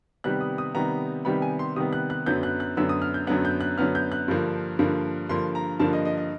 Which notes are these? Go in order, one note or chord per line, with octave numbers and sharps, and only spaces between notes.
C3 D#3 G3 B3 F#6
D#6
D#6
C3 D#3 G3 B3 A#5
C3 D#3 G3 B3 B5
G#5
C6
C3 D#3 G3 B3 D#6
F#6
F#6
F#2 D3 F#3 B3 G6
F#6
F#6
F#2 D3 F#3 B3 E6
D#6
F6
G6
F#2 D3 F#3 B3 F#6
G6
F#6
F#2 D3 F#3 B3 F6
G6
F#6
G2 D3 F3 A#3
G2 D3 F3 A#3
G2 D3 F3 A#3 C6
A#5
G2 D3 F3 A#3 A5
D#5
D#5
D#5